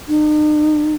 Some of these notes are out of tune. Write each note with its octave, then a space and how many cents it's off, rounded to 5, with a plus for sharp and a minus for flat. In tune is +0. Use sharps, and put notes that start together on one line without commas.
D#4 -45